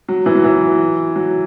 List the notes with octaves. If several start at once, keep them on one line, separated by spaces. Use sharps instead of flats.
F#3
E3
F#3
E3
F#3